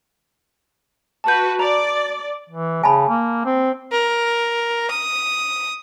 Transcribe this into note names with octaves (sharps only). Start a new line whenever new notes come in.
F#4 B4 A5 G6
D5 A#5
E3
C#3 G#5 A5 B5
A#3
C4
A#4
D#6